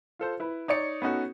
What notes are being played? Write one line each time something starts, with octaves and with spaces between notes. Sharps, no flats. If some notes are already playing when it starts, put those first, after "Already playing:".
F4 A4 C5
E4 B4
D#4 C#5 D5 C#7
B3 C#4 D#4 F#4 A4